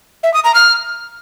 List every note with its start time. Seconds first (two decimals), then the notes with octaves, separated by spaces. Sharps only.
0.23 E5
0.34 D#6
0.44 A#5
0.55 F6